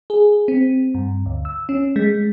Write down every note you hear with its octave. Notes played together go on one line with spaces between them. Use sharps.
G#4
C4
G2
D2
E6
C#4
G#3